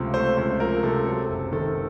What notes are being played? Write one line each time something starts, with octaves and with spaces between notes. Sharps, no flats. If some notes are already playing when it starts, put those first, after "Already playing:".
Already playing: C#2 C3 F3 A3
A3 C5
C#2 C5
F3 A#4
C3 A4
F#3 A4
F#1
D#3 A4